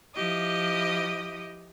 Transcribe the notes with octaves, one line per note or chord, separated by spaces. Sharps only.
F3 E4 G4 D#5 D#6